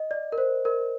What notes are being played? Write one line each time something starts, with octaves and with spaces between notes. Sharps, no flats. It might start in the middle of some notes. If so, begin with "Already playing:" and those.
Already playing: D#5
D5
A#4
C5
A#4